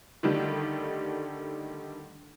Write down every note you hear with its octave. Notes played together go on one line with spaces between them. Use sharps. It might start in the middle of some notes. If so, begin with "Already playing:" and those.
D3 D#3 G3 A3